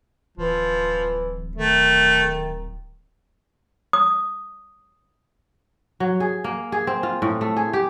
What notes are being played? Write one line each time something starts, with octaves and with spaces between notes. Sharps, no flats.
D1 E3 F3
D#3 A3
D#6
F#3
G#4
A#3
G#4
C4
F4
A2
A3
G#4
G4